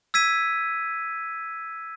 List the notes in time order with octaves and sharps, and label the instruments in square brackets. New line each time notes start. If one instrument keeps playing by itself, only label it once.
[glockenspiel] E6 G#6 B6 D#7